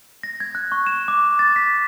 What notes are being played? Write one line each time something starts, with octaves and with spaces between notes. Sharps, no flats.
A#6
G#6
F#6
C#6
E7
D6
A6
B6